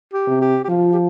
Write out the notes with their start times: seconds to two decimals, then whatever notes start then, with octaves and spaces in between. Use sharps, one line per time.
0.13 G4
0.28 C3
0.41 G4
0.64 G4
0.69 F3 F4
0.93 G4